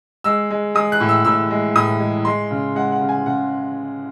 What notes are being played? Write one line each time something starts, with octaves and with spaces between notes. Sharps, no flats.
G#3 E6
G#3
G#3 D#6
F#6
A2
E6
A2 E6
G#3
A2 D#6
G#3
G#3 C6
C#3
G#3 F#5
F#5
C#3
G#5
C#3 F#5